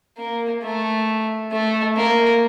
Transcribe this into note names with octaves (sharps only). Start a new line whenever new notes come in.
A#3
A3
A3
A#3